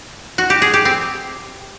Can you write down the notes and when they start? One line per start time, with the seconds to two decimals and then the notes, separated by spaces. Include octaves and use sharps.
0.38 F#4
0.50 G4
0.62 G#4
0.74 G4
0.85 C4